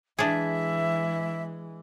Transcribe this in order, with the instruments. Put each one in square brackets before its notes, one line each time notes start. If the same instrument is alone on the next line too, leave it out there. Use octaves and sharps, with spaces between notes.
[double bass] E3 G#3 [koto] D4 G#4 [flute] E5